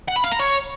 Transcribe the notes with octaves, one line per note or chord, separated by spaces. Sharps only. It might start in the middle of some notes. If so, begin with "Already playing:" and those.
F#5
B5
F5
A#5
C#5